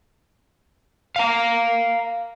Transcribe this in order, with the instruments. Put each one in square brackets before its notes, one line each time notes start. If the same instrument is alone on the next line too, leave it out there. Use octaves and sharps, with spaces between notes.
[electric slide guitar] F5 A#5